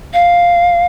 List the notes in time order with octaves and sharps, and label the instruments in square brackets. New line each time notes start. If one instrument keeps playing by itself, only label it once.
[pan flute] F5